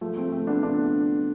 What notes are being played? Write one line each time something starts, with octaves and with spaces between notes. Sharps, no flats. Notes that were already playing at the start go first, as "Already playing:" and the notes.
F3 A3
A3 C4
A3 C4
B3 D4
D4 F4